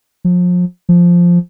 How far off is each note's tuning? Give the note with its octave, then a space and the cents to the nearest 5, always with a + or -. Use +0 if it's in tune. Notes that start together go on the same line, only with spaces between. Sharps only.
F3 +35
F3 +0